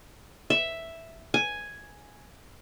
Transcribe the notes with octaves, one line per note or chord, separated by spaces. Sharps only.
E5
G#5